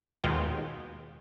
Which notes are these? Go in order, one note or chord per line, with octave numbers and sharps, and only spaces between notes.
D#2 B2 G#3 F4 G5